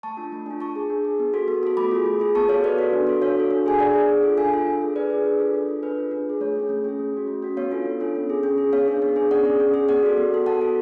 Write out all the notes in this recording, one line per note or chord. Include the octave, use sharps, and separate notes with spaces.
A3 A5 C#6
D4 F4
A3
D4 F4
D4 A5 C#6
G#4
D4
G#4
B3
F#4 A4
B3
F#4 A4
A3 B5 D6
F4 G#4
A3
F4 G#4
B3 A5 C#6
F#4 A4 C#5 F5
B3 B4 D5
F#4 A4
D4
F#4 A4
D4 C#5 F5
F#4 A4
D4
G#4 G#5
D4 D5 F#5
G#4
D4
F4 A4
D4 F5 G#5
F4 A4
D4
G#4
D4 B4 D5
G#4
D4
F4 A4
D4
F4 A4
D4 B4
F4 G#4
D4
F4 G#4
A3 C#5
C#4 G#4
A3
C#4 G#4
A3
C#4 F#4
A3
C#4 F#4
B3 C#5 F5
D4 F4 A4
B3
D4 F4 A4
C#4
G#4
C#4
G#4
B3 C#5 F5
D4 G#4
B3
D4 G#4
C#4 D5 F#5
G#4
C#4
G#4
B3 D5 F#5
F#4 A4
B3
F#4 A4
B3 F#5 A5
F#4 A4